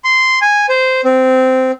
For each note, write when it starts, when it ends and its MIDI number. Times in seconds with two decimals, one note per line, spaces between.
0.04 0.39 84
0.42 0.66 80
0.69 1.01 72
1.05 1.71 60